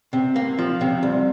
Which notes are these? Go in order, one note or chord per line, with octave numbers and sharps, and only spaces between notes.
C3
A#3
F3
C3
C2